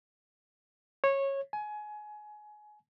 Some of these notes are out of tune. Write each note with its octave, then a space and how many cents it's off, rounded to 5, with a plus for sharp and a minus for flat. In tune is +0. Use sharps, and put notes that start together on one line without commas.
C#5 -15
G#5 +25